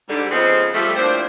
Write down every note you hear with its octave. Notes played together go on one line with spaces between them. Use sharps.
G#2 D3 G3
C#3 F3 G#3 B3 C4
F3 G3 A3
A2 F3 A#3 C4 D4 C5